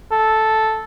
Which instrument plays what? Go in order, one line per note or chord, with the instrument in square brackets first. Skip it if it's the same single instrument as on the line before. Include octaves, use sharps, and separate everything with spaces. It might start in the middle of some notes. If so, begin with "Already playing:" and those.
[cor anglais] A4